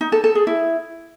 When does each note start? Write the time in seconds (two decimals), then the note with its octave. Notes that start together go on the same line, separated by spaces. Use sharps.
0.01 D#4
0.12 A4
0.24 A4
0.35 G#4
0.47 E4